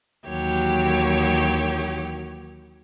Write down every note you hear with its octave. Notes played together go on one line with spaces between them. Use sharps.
D#2 E3 F#3 G4 C#5